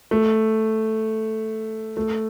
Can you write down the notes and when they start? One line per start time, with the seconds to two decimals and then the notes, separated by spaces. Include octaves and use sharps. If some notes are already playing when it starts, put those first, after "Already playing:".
0.11 A3
1.97 A3